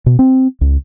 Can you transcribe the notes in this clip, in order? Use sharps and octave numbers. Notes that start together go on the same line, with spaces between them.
B2
C4
C#2